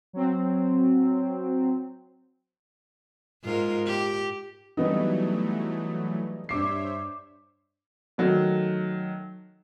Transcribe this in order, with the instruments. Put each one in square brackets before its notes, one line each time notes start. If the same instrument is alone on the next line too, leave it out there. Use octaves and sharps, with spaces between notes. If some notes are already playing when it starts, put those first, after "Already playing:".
[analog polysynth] F#3 C4
[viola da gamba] G#2 F4 A#4
G4
[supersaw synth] E3 F#3 A3 [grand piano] G3 B3 D#4
[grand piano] G2 D6 C7 [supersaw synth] C5 C#5 E5
[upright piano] D#3 F#3 A3